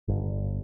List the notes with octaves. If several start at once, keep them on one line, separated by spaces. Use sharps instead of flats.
G1